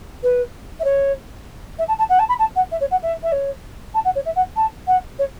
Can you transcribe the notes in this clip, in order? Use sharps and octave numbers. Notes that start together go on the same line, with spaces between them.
B4
E5
C#5
E5
A5
A5
F#5
A5
B5
A5
F#5
E5
C#5
F#5
E5
E5
C#5
A5
F#5
C#5
E5
F#5
A5
F#5
C#5